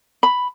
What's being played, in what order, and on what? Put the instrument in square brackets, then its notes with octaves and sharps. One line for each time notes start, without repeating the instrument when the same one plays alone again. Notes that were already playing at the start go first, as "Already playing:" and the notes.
[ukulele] B5